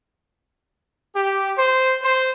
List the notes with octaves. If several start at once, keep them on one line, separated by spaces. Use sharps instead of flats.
G4
C5
C5